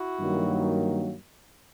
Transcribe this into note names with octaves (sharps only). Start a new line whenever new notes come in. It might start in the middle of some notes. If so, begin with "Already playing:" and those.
Already playing: E4 F#4
G2 D#3 F#3 A#3